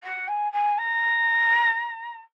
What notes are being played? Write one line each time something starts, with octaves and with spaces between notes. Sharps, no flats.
F#5
G#5
G#5
A#5